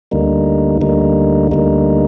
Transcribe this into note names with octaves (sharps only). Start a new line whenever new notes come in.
D2 D3 G3 A#3 D#4
D2 D3 G3 A#3 D#4
D2 D3 G3 A#3 D#4